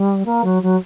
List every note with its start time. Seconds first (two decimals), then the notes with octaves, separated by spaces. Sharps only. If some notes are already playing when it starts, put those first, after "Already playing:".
Already playing: G3
0.25 A#3
0.43 F#3
0.62 F#3